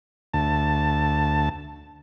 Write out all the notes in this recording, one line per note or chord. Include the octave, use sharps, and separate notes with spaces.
D2 A5